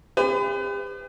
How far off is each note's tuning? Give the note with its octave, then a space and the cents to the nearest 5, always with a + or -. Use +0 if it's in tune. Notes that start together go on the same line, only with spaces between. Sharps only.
G4 +45 B4 +40